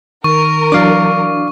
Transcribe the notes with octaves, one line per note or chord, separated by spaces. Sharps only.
D#3 A#4 C#6
E3 F#3 D4 D5 F5 D6